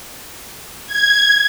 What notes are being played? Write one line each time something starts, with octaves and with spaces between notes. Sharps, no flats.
G#6